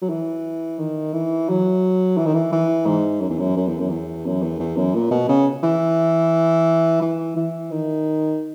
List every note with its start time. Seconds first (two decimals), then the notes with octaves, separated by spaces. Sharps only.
0.02 F#3
0.10 E3
0.79 D#3
1.13 E3
1.49 F#3
2.18 E3
2.26 D#3
2.34 E3
2.52 E3
2.86 G#2
3.21 F#2
3.30 E2
3.39 F#2
3.57 F#2
3.68 E2
3.79 F#2
3.90 E2
4.26 F#2
4.42 E2
4.59 E2
4.77 F#2
4.94 A#2
5.11 B2
5.29 C#3
5.63 E3
7.02 E3
7.37 E3
7.71 D#3